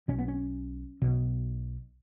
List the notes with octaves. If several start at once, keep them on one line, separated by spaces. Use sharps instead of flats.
B1 B2 C#4
B3
C#4
B1 B2